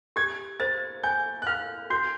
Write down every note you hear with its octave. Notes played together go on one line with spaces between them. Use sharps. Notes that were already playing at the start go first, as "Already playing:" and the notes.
G4 G#6
C5 A6
G#5 G6
F#6
F5 F6
F#4 G6